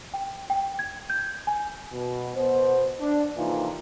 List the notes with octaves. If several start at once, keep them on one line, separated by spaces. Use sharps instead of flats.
G5
G5
G#6
G6
G#5
B2
B2 B3 C5
D4
F2 C3 E3 A#3 D#4 F4